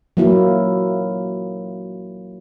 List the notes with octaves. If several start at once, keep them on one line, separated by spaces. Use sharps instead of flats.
F#3 A#3 E4